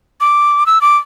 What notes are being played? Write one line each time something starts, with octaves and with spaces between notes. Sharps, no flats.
D6
E6
D6